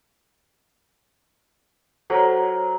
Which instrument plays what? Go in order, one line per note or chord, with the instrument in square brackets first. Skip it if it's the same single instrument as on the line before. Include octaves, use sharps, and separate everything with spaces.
[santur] F#3 A#4 [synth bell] A4 C5 C#5